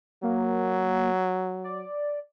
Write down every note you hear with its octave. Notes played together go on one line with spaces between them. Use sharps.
F#3 A#3
D5